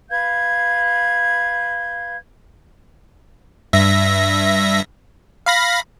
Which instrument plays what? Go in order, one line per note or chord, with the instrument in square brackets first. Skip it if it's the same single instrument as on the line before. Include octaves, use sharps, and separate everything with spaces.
[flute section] B4 F5 G6 G#6
[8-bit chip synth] G2 E5 A#6
F5 B5 A#6